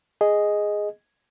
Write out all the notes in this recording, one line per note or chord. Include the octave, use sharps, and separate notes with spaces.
G#4 D#5